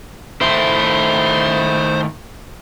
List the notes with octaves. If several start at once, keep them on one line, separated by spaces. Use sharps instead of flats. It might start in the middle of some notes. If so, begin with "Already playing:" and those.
D#3 A3 E4 C5